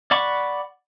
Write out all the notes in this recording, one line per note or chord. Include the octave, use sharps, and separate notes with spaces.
D5 F#5 B5 C#6 D6